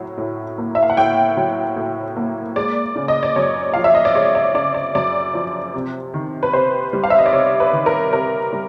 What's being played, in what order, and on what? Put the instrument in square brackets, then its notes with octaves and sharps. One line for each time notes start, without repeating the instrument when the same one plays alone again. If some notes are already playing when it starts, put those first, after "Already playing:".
Already playing: [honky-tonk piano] A2 F#3
A2
A#3
E5
F5
F#5
A2 G5
F#3
A2
A#3
G#3 D5
C#3
D#5
D5
F#2 C#5
F3 F5
E5
D#5
D5
G#3 C#5
D5
C#3 D5
D5
F#2 D5
F3
C3
D#3
B4
C3 C5
G3
F5
E5
D#5
D5
C3 C#5
B4
D#3
A#4
C3 A#4
G3